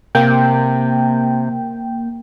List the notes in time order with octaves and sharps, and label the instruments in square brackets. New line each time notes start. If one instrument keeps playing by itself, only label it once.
[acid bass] C3 [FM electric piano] A#3 G5